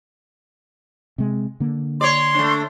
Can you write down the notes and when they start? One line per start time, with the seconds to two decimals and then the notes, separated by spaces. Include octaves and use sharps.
1.18 C3 G#3
1.60 D3 A#3
2.01 C#5 D5 C6
2.34 A3 D4